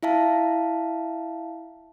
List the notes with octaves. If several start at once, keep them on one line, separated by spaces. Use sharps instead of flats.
E4 E5 F5 A5